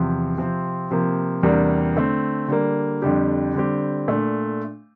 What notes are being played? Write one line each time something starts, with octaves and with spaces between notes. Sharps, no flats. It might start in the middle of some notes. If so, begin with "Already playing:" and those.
Already playing: E2 C3 F3
C3 F3 C4
C3 F3 A#3
E2 C3 G3 A#3 D4
D3 A3 C4
D3 G3 A#3
F2 D3 G3 D4 G4
D3 G3 C4 G4
A#2 A3 D4